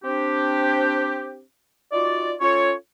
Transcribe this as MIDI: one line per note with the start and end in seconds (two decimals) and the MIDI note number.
0.04 1.42 60
0.04 1.42 62
0.04 1.42 67
1.93 2.33 63
1.93 2.33 65
1.93 2.33 66
1.93 2.33 74
2.41 2.72 61
2.41 2.72 65
2.41 2.72 69
2.41 2.72 73